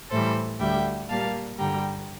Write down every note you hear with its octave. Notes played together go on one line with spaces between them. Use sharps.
A2 E3 G3 A4 C5
D2 D3 G3 E5 G5
A#2 G3 A#3 F5 A5
G2 D3 G3 G5 A#5